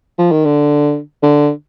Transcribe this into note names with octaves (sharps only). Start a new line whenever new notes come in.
F3
D#3
D3
D3